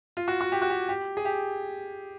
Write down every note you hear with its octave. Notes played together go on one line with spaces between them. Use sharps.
F4
F#4
F#4
G4
F#4
G4
G4
G#4
G4